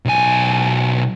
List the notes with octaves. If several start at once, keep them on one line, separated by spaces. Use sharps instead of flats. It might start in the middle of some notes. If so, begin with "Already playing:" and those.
B1 G#5